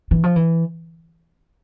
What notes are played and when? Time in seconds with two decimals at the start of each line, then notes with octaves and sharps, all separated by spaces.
0.11 E3
0.24 F3
0.36 E3